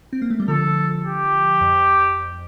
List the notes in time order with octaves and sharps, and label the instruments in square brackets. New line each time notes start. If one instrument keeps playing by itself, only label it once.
[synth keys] C4
A#3
A3
G3
[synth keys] D3 F3 [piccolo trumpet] A4
[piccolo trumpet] G4
[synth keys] F2